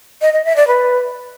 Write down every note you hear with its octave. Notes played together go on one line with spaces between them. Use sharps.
D#5
D#5
E5
D5
B4